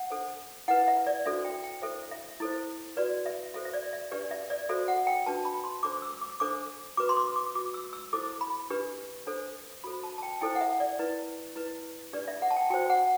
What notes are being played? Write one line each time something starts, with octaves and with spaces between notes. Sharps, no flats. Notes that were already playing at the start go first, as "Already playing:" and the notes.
Already playing: F#5
D4 A4 C5
E4 B4 F#5
E5
D5
D4 F#4 A4 C5 E5
G5
G5
E4 A4 C5 E5
E5
E4 A4 C5
F#4 B4 D5
E5
F#4 A4 C5 E5
E5
D5
E5
D4 G4 B4 D5
E5
D5
F#4 A4 C5 E5
F#5
G5
D4 F#4 B4 A5
B5
C6
D4 A4 C5 D6
D6
E6
D6
D4 A4 C5 D6
F#4 B4 D6
C6
D6
D6
F#4 B4 D6
E6
E6
E4 A4 C5 D6
B5
D4 G4 B4
D4 A4 C5
F#4 A4 C5 B5
A5
A5
G5
E4 A4 C5 G5
F#5
E5
D5
E4 B4
E4 B4
D4 G4 B4 D5
E5
F#5
A5
G5
F#4 C5 G5
F#5